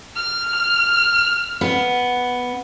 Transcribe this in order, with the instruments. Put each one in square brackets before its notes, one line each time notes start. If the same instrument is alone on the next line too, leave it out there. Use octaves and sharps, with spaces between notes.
[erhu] F6
[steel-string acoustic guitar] B3